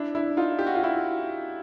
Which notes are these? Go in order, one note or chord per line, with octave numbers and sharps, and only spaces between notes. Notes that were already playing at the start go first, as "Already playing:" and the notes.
Already playing: D4 E4
D4 E4
D#4 F4
G4
F#4
F4
E4 F#4